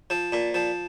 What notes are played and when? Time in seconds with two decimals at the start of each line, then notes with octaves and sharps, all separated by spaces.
0.10 F3
0.32 A#2
0.54 F3